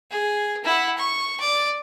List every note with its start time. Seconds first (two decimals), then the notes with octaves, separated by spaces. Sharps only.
0.11 G#4
0.64 E4 F#5
0.98 C#6
1.40 D5